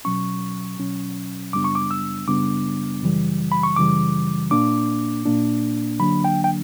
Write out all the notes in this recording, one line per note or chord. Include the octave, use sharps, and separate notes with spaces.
B2 F#3 C#4 C#6
B2 F#3 C#4
F#2 C#3 G3 B3 D4 D6
C#6
D6
E6
F#2 C#3 G3 B3 D4 D6
F#2 C#3 E3 G3
B5
C#6
F#2 C#3 E3 G3 D6
A#2 A#3 D4 D6
A#2 A#3 D4
D3 F#3 A#3 D4 B5
G5
G5